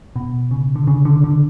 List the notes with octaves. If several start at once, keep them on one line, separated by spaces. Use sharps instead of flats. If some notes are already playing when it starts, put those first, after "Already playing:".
B2
C#3
D3
C#3
D3
D3